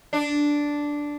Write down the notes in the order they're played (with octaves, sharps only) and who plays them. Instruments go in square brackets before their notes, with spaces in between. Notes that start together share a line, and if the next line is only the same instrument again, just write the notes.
[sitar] D4